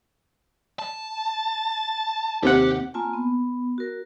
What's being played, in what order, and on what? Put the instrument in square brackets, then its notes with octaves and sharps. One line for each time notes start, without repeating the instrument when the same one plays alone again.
[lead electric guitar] A5
[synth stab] D#2 C3 F#5 [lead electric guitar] G4
[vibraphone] A#3 C4 F4 G#5 A5
B3
F#4 A#4